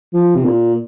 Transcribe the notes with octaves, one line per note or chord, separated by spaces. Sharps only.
F3
C3
A#2